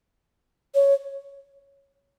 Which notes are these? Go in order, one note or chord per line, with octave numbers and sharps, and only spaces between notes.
C#5